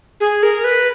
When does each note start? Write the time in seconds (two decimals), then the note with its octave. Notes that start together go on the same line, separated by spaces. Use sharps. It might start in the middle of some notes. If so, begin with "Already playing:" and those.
0.20 G#4
0.43 A#4
0.64 B4